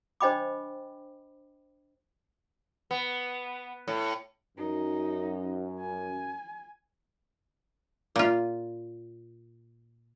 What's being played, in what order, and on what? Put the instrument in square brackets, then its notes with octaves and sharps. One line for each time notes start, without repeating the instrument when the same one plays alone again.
[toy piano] D4 C5 D#5 G5 B5 D6
[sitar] B3
A2
[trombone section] F#2 [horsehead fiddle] D#4
[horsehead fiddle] G#5
[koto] A#2 F4